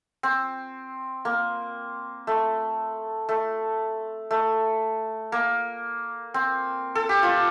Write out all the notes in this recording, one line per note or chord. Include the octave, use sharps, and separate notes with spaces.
C4
A#3
A3
A3
A3
A#3
C4
A4
G4
F4